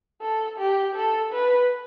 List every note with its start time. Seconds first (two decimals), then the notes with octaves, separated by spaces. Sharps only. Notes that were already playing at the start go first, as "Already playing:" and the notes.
0.21 A4
0.58 G4
0.95 A4
1.33 B4